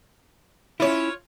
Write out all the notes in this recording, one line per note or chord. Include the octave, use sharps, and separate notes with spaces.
C#4 E4 F4 C#5